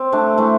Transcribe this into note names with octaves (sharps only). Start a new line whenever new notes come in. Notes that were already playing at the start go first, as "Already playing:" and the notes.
Already playing: C4
A3 D4
E3 A3